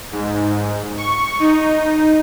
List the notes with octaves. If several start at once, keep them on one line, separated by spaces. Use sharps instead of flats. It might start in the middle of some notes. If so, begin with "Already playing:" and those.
G#2
C#6
D#4